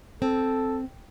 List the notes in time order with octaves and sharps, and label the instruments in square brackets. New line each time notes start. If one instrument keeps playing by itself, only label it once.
[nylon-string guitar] C4 [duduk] A4